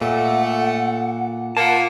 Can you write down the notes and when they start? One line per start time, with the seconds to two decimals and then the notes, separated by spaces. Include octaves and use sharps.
0.02 A#2 A3 F#5
1.57 A#3 F4 F#5 A5